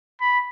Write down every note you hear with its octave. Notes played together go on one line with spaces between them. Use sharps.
B5